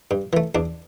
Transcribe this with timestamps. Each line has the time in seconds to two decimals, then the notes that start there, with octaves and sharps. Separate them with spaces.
0.11 G2
0.33 E3 A3
0.55 E2 D4